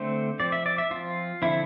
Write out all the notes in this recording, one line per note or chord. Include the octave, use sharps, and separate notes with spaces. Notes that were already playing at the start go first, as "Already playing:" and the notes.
Already playing: D3 A3 C4 C5
F3 C4 D5
E5
D5
E5
F3 C4 F4
D3 F3 C4 E4